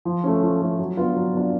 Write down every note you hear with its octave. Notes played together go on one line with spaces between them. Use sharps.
F3
A3 C#4
F3
A3 C#4
F#3
B3 D4 F4
F#3
B3 D4 F4